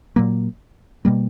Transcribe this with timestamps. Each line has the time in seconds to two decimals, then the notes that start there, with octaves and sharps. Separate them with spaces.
0.16 A#2 F#3 A#3
1.05 B2 G3 A#3